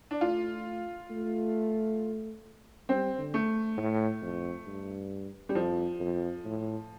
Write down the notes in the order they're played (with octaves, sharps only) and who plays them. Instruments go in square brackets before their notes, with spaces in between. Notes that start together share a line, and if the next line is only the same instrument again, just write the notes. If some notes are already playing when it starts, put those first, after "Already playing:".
[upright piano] D4
[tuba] A3 [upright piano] F4
[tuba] A3
[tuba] G3 [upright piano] C4
[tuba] D3
[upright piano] A3
[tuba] A2
F2
G2
[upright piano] G3
[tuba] F2 [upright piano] F3
[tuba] F2
A2